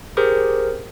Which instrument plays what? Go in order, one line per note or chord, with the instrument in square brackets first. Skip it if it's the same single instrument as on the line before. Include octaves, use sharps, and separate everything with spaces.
[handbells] G4 G#4 A#4 C5